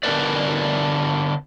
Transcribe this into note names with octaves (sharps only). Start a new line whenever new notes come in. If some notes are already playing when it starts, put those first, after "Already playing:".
D3 B3 D4 A#4 B4 D5